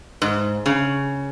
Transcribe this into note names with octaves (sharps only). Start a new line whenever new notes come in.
G#2
C#3